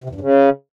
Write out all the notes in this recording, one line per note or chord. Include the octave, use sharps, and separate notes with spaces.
C3
E2
G2
C#3